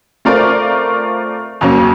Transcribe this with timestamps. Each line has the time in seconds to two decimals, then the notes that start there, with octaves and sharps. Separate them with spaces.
0.25 A3 C4 F4 A#4 D5
1.61 F2 C#3 F#3 A#3